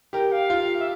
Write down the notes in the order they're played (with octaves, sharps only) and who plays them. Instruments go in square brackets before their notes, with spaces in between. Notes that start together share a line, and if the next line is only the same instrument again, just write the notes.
[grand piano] G4 A#4 [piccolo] G5
[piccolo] F5
[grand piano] F4
[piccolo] E5